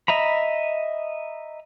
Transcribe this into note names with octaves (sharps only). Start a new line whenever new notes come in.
D#5 E5 A#5 B5